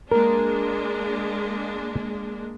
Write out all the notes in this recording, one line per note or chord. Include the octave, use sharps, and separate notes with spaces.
G#3 A#3 D4 A#4